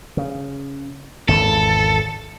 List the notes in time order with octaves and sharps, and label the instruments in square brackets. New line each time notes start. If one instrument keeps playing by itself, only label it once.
[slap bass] C#3
[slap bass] G#1 E2 C#3 [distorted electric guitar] A4